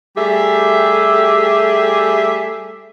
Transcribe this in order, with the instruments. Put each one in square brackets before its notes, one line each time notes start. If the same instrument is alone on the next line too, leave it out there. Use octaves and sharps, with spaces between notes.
[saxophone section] G3 A3 G4 G#4 E5